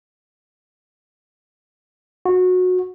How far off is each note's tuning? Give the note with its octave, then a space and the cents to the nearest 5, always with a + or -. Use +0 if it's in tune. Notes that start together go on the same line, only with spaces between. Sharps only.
F#4 -20